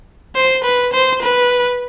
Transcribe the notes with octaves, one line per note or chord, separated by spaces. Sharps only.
C5
B4
C5
B4